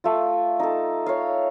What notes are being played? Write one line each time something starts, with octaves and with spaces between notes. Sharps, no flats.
A3 F4
D#4 A4
C#5 F5